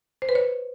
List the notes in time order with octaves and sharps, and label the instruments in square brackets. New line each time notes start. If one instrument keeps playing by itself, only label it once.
[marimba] C5
B4
C#5